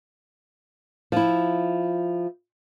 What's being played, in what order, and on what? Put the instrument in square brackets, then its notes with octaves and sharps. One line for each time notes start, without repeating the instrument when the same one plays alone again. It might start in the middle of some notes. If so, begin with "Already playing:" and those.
[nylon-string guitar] F3 E4